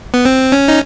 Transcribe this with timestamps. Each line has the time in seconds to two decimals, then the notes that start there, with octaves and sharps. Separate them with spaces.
0.14 B3
0.25 C4
0.52 C#4
0.68 D#4